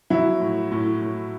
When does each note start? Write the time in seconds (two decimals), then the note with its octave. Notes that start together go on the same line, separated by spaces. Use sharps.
0.10 F#3 E4
0.40 A2
0.71 A2
1.01 A2